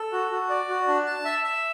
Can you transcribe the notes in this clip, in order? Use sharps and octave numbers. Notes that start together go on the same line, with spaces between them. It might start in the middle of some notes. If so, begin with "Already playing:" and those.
Already playing: A4
F#4
F#4
D5
F#4
D4
A5
E5
E5